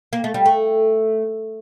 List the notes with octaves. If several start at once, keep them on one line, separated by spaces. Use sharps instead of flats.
A#3
A3
G3
A3